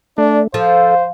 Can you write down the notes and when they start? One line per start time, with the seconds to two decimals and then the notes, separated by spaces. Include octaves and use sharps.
0.18 A3 D4 D5
0.54 F3 A4 C5 F5